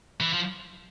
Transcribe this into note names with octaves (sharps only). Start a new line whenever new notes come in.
E3
F3